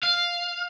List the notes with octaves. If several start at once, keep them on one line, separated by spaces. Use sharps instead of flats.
F5